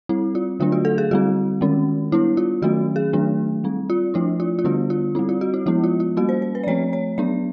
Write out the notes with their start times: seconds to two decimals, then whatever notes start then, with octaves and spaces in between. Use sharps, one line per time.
0.09 G3 C4 E4
0.35 F4
0.60 D3 F#3 A3 D4 F4
0.72 F#4
0.85 A4
0.98 G#4
1.11 D3 G3 C4 F#4
1.61 D#3 G#3 C#4
2.12 G3 B3 D4 E4
2.37 F4
2.62 D#3 F#3 A3 C#4 F#4
2.96 G#4
3.13 D#3 F#3 A3 D4
3.64 G3 C4
3.90 F4
4.14 F3 A3 D4 E4
4.40 F4
4.59 F4
4.64 D3 G3 B3 D4 F#4
4.90 F4
5.15 G3 C4 E4
5.29 F4
5.41 F#4
5.54 E4
5.66 F3 G#3 B3 E4
5.84 F4
6.00 F4
6.17 G3 A#3 C#4 F#4
6.29 C5
6.42 C5
6.55 B4
6.63 D5
6.67 F3 A3 C4 C#5
6.93 C#5
7.18 F#3 B3 D4 D5